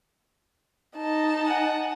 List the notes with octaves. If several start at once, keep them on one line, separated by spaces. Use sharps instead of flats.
D#4 A5
F#5 G#5